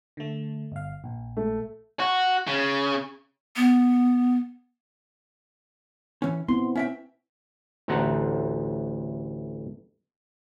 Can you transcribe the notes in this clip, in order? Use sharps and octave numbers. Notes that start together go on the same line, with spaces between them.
D3 A3
G1 F5
A#1
A3
F#4
C#3
B3
E3 C#4
B3 C4 E4 C6
C4 C#4 E5 G5
A1 D2 C4 A4 F#5 A#5